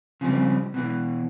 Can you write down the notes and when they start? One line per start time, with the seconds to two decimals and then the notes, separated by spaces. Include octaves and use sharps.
0.21 C#3 F3 G3 C4
0.74 B2 E3